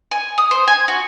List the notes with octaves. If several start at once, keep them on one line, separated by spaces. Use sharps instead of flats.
G#5
D#6
C5
G#5
F#4